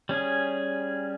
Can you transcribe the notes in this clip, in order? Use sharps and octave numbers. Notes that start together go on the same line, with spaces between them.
G3 C#4 G#4 G#5